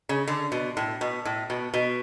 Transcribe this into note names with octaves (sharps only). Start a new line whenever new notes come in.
C#3
D3
B2
A2
B2
A2
B2
B2